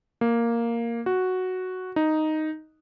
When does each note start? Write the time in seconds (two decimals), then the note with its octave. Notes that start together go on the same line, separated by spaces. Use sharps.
0.21 A#3
1.06 F#4
1.96 D#4